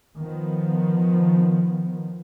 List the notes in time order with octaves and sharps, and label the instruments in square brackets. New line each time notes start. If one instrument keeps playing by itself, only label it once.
[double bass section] D#3 F3 B3